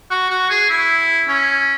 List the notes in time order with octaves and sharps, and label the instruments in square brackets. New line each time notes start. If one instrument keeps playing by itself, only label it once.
[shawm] F#4
F#4
G#4
E4
C#4